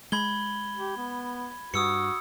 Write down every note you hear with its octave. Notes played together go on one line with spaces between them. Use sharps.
G#3 B5 G#6 G7
G4
B3
G2 F#4 D#6 E6 C#7